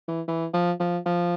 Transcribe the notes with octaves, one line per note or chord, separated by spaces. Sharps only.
E3
E3
F3
F3
F3